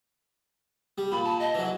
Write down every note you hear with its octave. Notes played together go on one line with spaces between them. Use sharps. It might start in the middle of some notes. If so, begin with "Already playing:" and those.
G3
A#2 B5
A5
D#5
E3 F#3